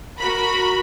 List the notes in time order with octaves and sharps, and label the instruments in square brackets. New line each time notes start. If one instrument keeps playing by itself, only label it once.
[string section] F#4 A#4 B5